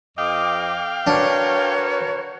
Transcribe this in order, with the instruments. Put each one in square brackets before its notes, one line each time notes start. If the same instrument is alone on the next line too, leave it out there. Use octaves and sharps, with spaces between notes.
[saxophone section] F2 D#5 [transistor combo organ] F5 G5 [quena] D6
[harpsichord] D4 [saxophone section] F#4 A#4 B4 [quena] C#5